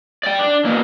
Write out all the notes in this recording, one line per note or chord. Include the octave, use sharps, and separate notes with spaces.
D5 G5
D4
B2 A#3